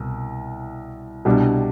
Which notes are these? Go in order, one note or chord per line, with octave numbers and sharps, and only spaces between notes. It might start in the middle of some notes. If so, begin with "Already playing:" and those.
Already playing: C2 B2
C2 B2 G3 D4